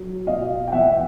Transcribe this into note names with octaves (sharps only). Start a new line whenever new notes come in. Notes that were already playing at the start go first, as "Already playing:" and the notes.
Already playing: F#3
B2 D#5 F5
G5
E2 E5 F#5